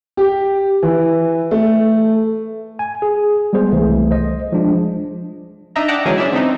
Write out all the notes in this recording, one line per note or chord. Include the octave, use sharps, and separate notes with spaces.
G4
E3
A3
G#5
G#4
G3 G#3 B3 G#4 C5
C2 E3 A3
C5 D#5
F3 G#3 D4
D4 D#4 D#5 E5 A#5
D5 F#5 G5 A5 A#5
D3 E3 F#3 G#3 C#4 G#4
C#4 D4 E4 E5
C4 D#4